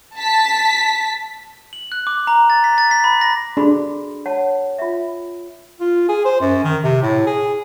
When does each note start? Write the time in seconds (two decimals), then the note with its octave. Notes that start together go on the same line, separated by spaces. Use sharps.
0.16 A5 B6
1.73 F#7
1.92 F#6
2.07 D6
2.27 A#5
2.50 A6
2.64 B6
2.78 A6
2.91 B6
3.04 B5
3.21 A#6
3.57 D4 F#4 G#4 B5
4.26 C#5 F#5 A5
4.79 F4 E5
5.81 F4
6.09 G#4
6.25 C5
6.40 F#2
6.64 D#3
6.84 C3
7.02 A2
7.26 G#4